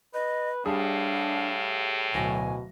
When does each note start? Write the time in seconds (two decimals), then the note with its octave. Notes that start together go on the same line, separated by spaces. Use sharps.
0.14 B4 D#5
0.66 A2 G3 D4 G#4 F5
2.14 D1 B2 F#3 G#5 A#6